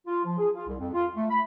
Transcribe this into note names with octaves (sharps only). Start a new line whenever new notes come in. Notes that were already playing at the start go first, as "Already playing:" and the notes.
F4
F3
G#4
F4
C2
F2
F4
A3
B5